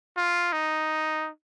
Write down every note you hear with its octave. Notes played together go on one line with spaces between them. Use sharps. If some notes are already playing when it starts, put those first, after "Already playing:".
F4
D#4